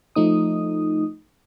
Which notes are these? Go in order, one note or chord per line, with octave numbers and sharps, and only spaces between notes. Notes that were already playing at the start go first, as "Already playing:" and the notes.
F3 A3 D#4 D#6